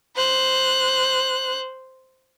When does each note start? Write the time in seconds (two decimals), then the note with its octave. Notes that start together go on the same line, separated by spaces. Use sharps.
0.16 C5 F#6